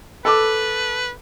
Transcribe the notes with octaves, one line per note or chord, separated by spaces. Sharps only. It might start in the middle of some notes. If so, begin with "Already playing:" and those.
A4 B4 D6